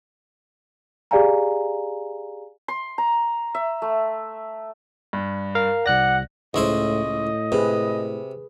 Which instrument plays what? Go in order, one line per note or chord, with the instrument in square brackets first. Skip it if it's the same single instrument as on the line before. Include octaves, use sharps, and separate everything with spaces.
[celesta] G4 G#4 D5 F5 G#5 A#5
[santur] C6
A#5
E5
A3
[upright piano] G2
[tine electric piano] A#4 F5 A#5
[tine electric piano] C2 F#6 A#6 [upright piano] D5 [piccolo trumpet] F#5
[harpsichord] C#2 E4 C5 [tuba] A2 [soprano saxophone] D#5
[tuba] A2
[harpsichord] C3 [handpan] G#4 B4